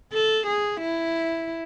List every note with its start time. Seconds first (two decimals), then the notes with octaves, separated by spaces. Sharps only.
0.13 A4
0.47 G#4
0.81 E4